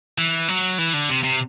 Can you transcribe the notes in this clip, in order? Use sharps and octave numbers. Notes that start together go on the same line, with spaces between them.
E3
F#3
E3
D3
C3
C3